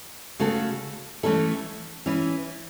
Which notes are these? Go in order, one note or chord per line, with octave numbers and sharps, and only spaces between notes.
C#3 A3 F#4 A4
E3 A3 C#4 E4 A4
E3 C#4 E4